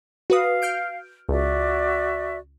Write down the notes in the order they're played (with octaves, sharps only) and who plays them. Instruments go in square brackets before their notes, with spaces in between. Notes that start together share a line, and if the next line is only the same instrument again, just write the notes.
[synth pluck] F#4 B4 D#6 [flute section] F5
[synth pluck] F6 G6 D7
[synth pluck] C#2 [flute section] F#4 D5 E5